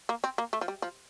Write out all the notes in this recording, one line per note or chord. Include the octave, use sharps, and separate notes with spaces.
A#3
C4
A#3
A3
F3
G3
F3